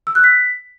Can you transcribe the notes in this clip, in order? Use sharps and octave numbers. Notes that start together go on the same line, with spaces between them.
E6
F#6
B6